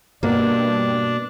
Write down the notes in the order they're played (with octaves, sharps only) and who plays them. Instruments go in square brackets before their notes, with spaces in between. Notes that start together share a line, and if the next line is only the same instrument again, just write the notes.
[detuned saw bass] G2 [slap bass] B2 [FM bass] A#3 [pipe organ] D4